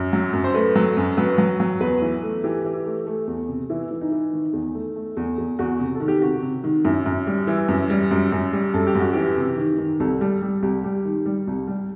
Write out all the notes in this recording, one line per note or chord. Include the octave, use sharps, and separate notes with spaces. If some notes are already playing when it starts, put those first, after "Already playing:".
Already playing: F#2
F#3
F#2
C5
A3 B4
F#3
F#2
F#3 B4
F#3
F#3
E2 B4
E3
A3
E3 G4
E3
A3
A3
E2
C3
E3 E4
E3
D#4
E3
D#3
E2
A3
A3
E2
E2
E2 F#4
C3
A4
D#3
G4
C3 F#4
C3
D#3
F#2 E4
F#2
G3
E3 E4
F#2
G3
F#2
F#2
G3
F#2 A4
G4
F#2
F#4
E3 G4
C3
D#3
D#3
C2 A4
G3
G3
C2 G4
G3
D#3
G3
C2
G3